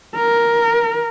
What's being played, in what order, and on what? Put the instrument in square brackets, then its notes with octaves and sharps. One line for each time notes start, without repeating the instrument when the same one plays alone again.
[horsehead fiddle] A#4